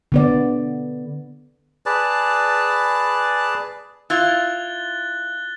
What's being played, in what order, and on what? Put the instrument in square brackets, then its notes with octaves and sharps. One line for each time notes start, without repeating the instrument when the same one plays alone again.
[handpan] D3 B3 D5
[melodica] G#4 B4 D5 A5
[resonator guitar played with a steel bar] E4 F4 [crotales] F#6 A6 G7